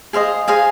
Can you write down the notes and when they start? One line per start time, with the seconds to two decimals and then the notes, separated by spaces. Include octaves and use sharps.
0.13 G#4 C5 D#5 F5
0.48 G#4 C5 D#5 F5 G#5